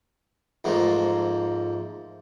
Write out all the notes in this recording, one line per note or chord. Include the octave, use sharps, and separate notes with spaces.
F2 G#2 A3 A#3